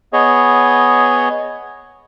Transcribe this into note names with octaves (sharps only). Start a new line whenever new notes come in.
B3 G#4 C#5 D#5